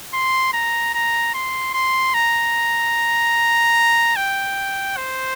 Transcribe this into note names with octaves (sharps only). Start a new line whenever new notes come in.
C6
A#5
A#5
C6
C6
A#5
G5
C5